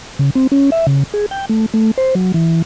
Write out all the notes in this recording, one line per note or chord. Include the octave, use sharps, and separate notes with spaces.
C#3
C4
C#4
E5
C#3
G#4
G5
A3
A3
C5
F#3
E3